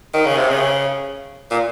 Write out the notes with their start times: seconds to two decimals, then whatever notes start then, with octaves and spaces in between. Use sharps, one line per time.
0.14 D#3
0.26 C#3
0.38 C3
0.50 C#3
1.51 A#2